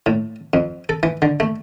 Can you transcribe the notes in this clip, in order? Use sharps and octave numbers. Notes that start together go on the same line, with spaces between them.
A2
F2
A4
E3
D3
A3